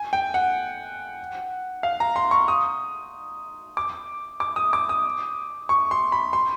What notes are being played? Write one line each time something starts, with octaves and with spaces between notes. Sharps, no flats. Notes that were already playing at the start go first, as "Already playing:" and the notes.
Already playing: G#5
G5
F#5
F5
A#5
C6
C#6
D#6
D6
D6
D#6
D6
D#6
C#6
C6
B5
C6